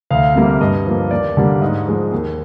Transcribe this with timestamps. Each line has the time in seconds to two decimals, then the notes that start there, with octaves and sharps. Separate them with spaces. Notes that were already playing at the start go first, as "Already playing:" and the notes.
0.11 D2 F5
0.35 C3 G3 A#3
0.61 G2 D#5
0.86 F3 A#3
1.11 D#2 D5
1.37 D3 G3 A#3
1.62 G#2 D#5
1.87 F3 G#3
2.12 D#2